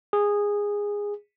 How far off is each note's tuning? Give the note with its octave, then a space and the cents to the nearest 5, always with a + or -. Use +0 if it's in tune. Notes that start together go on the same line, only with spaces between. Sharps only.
G#4 -15